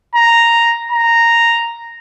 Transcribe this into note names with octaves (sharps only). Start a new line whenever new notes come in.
A#5
A#5